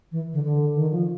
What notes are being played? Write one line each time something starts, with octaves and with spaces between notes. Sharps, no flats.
E3
D3
D3
D#3
F3